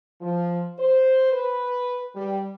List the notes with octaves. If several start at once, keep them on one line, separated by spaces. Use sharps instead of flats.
F3
C5
B4
G3